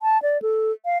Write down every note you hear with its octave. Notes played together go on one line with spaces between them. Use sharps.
A5
D5
A4
F5